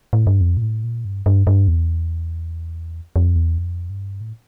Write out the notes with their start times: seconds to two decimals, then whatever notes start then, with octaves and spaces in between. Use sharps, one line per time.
0.13 A2
0.27 G2
0.41 F2
0.57 A#2
0.62 A2
0.84 A#2
1.05 G2
1.26 G2
1.47 G2
1.68 E2
3.16 F2
3.36 E2
3.58 F2
3.90 G2
4.21 A2